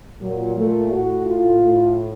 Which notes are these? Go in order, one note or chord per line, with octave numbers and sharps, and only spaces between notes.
A#2 F#3
A3
A2 F#4
F4
A2